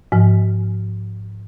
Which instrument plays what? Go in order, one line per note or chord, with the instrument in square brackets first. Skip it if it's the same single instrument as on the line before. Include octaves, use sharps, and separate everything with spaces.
[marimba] G#2 F3